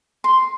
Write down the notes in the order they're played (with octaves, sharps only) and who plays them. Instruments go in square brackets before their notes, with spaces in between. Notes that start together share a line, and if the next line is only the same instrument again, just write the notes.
[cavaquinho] C6